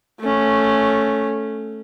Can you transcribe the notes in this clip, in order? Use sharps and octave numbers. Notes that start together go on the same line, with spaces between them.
A3 C#4